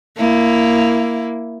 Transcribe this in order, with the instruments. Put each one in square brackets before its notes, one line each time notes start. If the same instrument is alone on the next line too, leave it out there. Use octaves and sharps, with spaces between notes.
[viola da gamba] A#3 E4